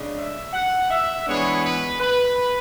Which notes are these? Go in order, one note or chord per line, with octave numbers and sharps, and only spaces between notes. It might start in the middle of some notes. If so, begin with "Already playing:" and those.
Already playing: C#3 G#3 D4
E5
F#5
E5
E3 G#3 B3 D4 C#5
B4
B4